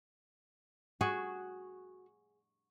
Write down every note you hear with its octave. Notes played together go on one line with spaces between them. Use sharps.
F#4 G#4